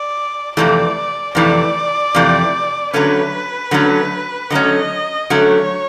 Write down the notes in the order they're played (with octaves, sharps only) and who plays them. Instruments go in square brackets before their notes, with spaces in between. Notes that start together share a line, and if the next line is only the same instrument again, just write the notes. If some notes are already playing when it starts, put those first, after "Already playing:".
Already playing: [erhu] D5
[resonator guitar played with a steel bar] F2 C3 E3 A3 [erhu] D5
[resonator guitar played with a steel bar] F2 C3 E3 A3 [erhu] D5
[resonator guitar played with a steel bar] F2 C3 E3 A3
[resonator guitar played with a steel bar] D3 F#3 A3 C#4 [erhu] B4
[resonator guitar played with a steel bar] D3 F#3 A3 C#4
[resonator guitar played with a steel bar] D3 F#3 A3 C#4 [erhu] D#5
[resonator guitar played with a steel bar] D3 F#3 A3 C#4 [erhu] C#5